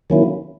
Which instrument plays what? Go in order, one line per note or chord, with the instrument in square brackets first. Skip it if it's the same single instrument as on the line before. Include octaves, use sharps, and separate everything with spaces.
[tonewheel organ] D#3 F#3 A#3 C#4 E4